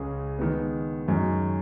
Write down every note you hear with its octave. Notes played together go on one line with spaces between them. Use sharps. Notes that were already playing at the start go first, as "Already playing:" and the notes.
Already playing: C#2 C#3 G#3 C#4 G#4
D#3 G#3 B3
F#2 D#3 G#3 C#4